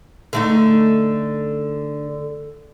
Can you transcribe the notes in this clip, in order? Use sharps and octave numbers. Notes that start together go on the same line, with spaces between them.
D3 A3 D#4